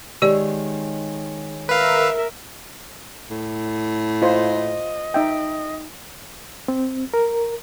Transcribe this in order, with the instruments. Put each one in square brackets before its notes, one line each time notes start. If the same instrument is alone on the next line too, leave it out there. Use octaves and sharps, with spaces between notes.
[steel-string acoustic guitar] D#3 G#3 C#5 [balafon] G4 D5
[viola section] A#4 E5 [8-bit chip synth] B4 F5
[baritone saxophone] A2
[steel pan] F4 C5 [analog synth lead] D#5
[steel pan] D#4 E5 G5
[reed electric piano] C4
A#4